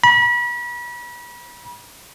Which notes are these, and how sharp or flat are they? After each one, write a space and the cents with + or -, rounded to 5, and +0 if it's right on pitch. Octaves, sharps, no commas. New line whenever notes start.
B5 -35